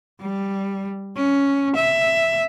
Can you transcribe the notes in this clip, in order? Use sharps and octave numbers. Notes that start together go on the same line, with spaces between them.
G3
C#4
E5